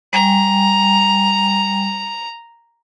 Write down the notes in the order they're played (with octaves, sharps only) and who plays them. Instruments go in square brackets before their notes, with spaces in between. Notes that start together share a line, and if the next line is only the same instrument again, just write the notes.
[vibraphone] G3 G5 G#5 [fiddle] A#5